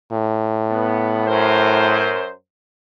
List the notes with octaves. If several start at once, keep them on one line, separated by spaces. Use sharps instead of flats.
A2
B3
F#2 A#4 C5